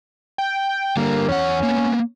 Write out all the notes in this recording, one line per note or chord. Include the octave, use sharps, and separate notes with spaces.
G5
D3 G3 A#3
E2 C#4 F#5
A#3 B3